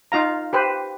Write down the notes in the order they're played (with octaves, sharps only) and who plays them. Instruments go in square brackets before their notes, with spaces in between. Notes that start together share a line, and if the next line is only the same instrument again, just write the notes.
[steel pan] D#4 F4 F5 A#5
G4 B4 C5